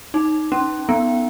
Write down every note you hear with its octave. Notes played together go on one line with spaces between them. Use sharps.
D#4
C#4
B3